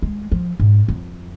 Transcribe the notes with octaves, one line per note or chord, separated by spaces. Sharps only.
G#3
F3
G#2
F2